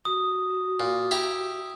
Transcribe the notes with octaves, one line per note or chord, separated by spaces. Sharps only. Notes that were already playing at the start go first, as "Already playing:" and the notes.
F#4 D#6
A#2
E4 G4 A#5